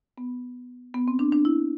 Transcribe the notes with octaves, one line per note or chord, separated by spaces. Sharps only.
B3
B3
C4
D4
D4
E4